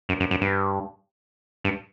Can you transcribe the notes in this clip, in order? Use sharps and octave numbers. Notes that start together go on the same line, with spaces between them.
F#2
F#2
F#2
G2
G2